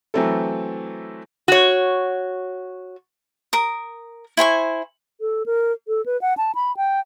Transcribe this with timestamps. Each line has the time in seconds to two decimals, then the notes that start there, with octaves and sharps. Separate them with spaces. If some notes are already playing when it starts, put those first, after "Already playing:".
0.14 E3 F#3 A3 C4 E4 A4
1.48 F#4 C#5
3.53 A#4 D#6
4.37 E4 C5 G#5 C#6
5.21 A4
5.46 A#4
5.88 A4
6.06 B4
6.22 F#5
6.37 A5
6.55 B5
6.77 G5